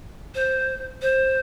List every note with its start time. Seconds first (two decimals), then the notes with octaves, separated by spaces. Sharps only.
0.35 C5
1.02 C5